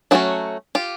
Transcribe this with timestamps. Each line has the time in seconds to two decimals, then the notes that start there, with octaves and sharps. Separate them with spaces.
0.11 F#3 A3 C#4 E4 F#4
0.75 F4 G4